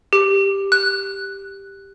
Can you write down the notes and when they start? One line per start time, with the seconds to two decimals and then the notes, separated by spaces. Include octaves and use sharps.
0.13 G4
0.72 F#6